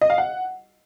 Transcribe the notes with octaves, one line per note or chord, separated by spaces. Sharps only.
D#5
F5
F#5